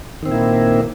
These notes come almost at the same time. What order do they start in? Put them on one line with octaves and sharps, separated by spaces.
D#3 C4 A#2 E4 A#3